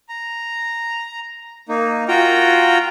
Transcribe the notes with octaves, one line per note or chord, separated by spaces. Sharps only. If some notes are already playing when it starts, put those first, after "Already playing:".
A#5
A#3 D#4
F4 F#4 G5 A#5